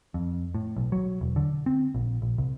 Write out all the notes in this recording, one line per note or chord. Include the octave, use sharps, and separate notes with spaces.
F2
A2
B1
F#3
E1
D3
C4
A#1
A#1
C2